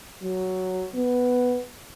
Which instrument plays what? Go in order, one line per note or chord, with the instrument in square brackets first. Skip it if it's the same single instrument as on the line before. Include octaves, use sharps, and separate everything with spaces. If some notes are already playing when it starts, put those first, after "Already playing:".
[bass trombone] F#3
B3